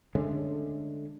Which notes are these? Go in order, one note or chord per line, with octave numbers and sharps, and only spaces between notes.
D3 G#3 A3 C#4